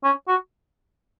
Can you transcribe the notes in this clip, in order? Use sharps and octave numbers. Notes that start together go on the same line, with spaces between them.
C#4
F#4